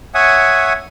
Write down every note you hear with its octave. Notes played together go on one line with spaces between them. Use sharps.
C#5 E5 F#5 G#5 D#6